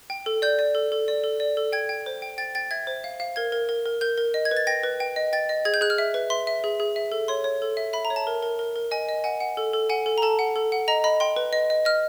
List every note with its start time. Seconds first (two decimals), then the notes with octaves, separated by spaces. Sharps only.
0.10 G5
0.26 A4
0.42 D5 G6
0.59 D5
0.75 A4
0.92 A4
1.08 D5
1.24 A4
1.40 D5
1.57 A4
1.73 G5 G#6
1.89 G5
2.06 C5
2.22 G5
2.38 G5 A6
2.55 G5 A6
2.71 E5 G#6
2.87 C5
3.04 F5
3.20 F5
3.36 A#4 G#6
3.52 A#4
3.69 A#4
3.85 A#4
4.01 A#4 G6
4.18 A#4
4.34 D#5
4.45 G#6
4.51 B4
4.57 A6
4.67 G5 A#6
4.83 B4
5.00 G5
5.16 D#5
5.33 G5 A6
5.49 D#5
5.65 G#4 G#6
5.74 G6
5.81 G#4 F#6
5.90 F6
5.98 E5
6.14 B4
6.30 E5 C6
6.47 E5
6.64 G#4
6.80 G#4
6.96 E5
7.12 A4
7.28 C#5 C6
7.44 C#5
7.62 A4
7.77 E5
7.93 E5 B5
8.05 A#5
8.10 C#5
8.16 A5
8.27 A#4
8.43 A#4
8.59 A#4
8.76 A#4
8.91 D#5 G#5
9.09 D#5
9.24 F#5 G#5
9.40 F#5
9.57 A4
9.73 A4
9.90 F#5 G#5
10.06 A4
10.18 A#5
10.22 A4 A5
10.39 F#5
10.56 A4
10.72 F#5
10.88 D#5 A#5
11.04 D#5 B5
11.20 G5 C6
11.36 B4
11.53 D#5
11.70 D#5
11.85 D#5 F6